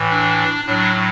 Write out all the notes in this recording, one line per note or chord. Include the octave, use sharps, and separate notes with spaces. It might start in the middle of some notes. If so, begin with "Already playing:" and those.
Already playing: A2 E3
D4
A2 F#3 D4